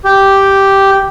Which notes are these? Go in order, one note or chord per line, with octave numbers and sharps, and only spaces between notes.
G4